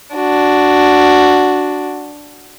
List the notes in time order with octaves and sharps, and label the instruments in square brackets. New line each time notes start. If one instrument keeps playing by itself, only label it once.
[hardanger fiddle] D4 F#4